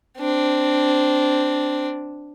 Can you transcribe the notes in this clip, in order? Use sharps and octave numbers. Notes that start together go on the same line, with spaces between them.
C4 D4